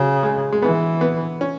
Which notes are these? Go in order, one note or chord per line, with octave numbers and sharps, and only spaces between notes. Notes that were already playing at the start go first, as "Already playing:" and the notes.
Already playing: C#3 F#3
G#3
G#3
E3 B3
B3
C#4